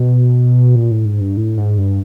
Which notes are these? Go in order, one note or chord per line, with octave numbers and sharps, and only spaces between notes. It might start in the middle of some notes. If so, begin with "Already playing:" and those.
Already playing: B2
A#2
A2
G#2
G2
A2
G#2
G2